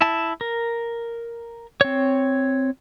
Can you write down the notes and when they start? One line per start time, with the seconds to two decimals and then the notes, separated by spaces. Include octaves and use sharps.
0.01 E4 A5
0.41 A#4
1.81 C4 C#5